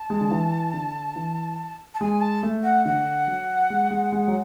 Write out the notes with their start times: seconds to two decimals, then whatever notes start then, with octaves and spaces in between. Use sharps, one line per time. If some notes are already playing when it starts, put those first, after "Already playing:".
Already playing: A5
0.10 G#3
0.21 D3
0.31 E3
0.74 D3
1.16 E3
1.94 A5
2.01 G#3 G#5
2.21 A5
2.43 A3
2.64 F#5
2.85 D3 F#5
3.27 F#3
3.70 G#3
3.91 G#3
4.12 G#3
4.28 F#3